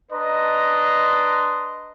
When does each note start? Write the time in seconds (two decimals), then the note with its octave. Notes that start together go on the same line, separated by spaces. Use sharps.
0.12 D4 B4 D#5 A#5 C6